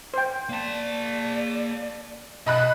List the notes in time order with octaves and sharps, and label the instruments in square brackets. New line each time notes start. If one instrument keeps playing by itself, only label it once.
[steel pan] C5 G5
[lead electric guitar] A#3 A5 [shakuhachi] D5
[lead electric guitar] B1 [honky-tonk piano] D#5 B5 F#6